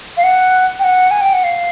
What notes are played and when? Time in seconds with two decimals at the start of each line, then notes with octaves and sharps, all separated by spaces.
0.17 F5
0.24 F#5
0.79 G5
0.84 F#5
1.11 G#5
1.21 G5
1.33 F#5
1.44 F5